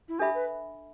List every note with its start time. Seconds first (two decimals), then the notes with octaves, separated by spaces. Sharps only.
0.09 E4
0.19 D4 G4 A4 E5 B5
0.34 B4